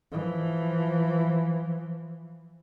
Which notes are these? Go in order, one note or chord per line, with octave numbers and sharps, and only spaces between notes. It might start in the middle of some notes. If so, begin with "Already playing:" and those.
E3 F3